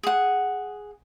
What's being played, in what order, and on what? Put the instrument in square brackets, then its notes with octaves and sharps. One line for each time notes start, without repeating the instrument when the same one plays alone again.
[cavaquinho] G#4 F#5